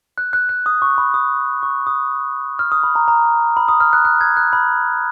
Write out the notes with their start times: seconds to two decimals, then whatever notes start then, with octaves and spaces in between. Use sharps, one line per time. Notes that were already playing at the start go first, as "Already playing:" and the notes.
0.18 F#6
0.33 F#6
0.49 F#6
0.66 D#6
0.82 C#6
0.98 B5
1.14 D#6
1.63 C#6
1.87 D#6
2.59 F6
2.72 D#6
2.83 B5
2.96 A#5
3.08 A#5
3.57 B5
3.68 D#6
3.80 F6
3.93 F#6
4.05 F#6
4.21 G#6
4.37 F#6
4.53 B5